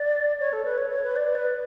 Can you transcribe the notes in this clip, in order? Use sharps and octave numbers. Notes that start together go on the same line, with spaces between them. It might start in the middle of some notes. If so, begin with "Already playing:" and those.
Already playing: D5
C#5
A4
B4
C#5
C#5
B4
D5
B4